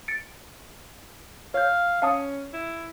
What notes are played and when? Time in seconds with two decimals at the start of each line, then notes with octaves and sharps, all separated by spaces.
0.08 A6 C#7 D7
1.54 C#5 F5 G6
2.02 C#4 F5 A5 D#6
2.53 E4